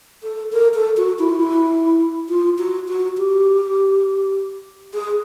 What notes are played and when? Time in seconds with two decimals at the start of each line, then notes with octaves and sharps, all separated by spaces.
0.23 A4
0.52 A#4
0.74 A4
0.97 F#4
1.19 E4
1.29 F4
1.40 E4
2.29 F4
2.58 F#4
2.88 F#4
3.18 G4
4.94 G#4